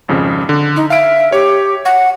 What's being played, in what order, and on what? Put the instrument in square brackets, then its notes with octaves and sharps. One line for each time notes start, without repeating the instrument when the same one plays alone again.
[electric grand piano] G#1 F2 C#3
D3
[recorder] D#4
[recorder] E5 [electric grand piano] F5 D7
[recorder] G4 [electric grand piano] C#5
[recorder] F#5